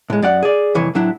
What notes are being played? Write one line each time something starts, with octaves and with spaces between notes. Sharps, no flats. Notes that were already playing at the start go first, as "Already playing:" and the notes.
A2 G#3
F#2 D5 F#5
G#4 D5
C2 F2 E3 C#5
A2 F#3 D4 E4